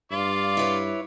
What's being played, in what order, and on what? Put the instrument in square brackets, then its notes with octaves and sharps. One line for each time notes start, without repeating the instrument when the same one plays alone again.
[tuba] G2 [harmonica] F4 D5 F5
[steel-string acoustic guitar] E4 B4 C#5